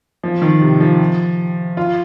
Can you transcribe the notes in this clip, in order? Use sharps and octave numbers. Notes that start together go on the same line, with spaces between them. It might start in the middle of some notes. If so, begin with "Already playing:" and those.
F3
D#3
C3
F3
F4